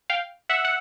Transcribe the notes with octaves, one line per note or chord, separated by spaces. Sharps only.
F5 G5
E5 F#5
F#5